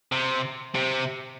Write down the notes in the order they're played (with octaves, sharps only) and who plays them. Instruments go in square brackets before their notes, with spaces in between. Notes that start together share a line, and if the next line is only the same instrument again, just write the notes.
[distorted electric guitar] C3
C3